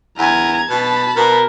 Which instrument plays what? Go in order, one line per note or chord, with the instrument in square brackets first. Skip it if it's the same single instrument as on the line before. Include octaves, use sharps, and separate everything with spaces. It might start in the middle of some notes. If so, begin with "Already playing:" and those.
[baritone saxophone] E2 [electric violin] A#5 G#6
[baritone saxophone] B2 [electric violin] A5 B5
[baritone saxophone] B2 [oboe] A#4